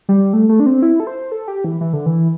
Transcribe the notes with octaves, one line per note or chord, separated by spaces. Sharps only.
G3
A3
A3
D4
C4
E4
A4
C5
A4
G4
E3
E3
D3
E3